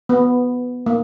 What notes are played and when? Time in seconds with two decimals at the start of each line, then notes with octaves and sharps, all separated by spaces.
0.09 B3
0.86 A#3